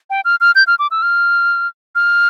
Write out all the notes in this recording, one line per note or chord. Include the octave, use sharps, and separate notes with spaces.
G5
F6
F6
G6
F6
D6
E6
F6
F6